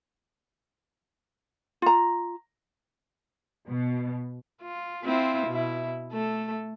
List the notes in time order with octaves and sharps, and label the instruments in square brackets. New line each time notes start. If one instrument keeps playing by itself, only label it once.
[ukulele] F4 A#5
[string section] B2
[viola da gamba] F4
C4 E4 F4
B2 E4
A3 A4